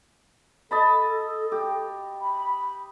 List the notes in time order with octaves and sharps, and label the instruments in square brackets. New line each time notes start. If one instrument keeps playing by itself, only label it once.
[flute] A4 [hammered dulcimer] D#5 A5 B5
[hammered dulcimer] G4
[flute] B5